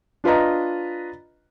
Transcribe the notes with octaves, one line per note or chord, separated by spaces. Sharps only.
D4 F4 B4 D#5 A#5